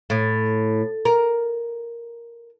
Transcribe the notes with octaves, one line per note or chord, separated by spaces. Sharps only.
A2
A#4